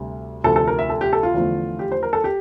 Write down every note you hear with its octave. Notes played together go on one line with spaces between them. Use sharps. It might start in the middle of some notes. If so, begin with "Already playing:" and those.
Already playing: D2 C3 G3
D2 C3 F3 A4
A4
A#4
E5
A4
G4
A4
F4
E2 D3 F3 A3
G4
C5
A#4
A4
G4